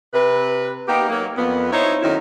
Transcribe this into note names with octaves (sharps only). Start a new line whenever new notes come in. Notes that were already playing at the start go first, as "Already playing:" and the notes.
C3 B4
A#3 B3 D#4 G4
F#3 A#3
F2 B3
D#4 E4 C5 C#5
F#2 D#3 A3 E4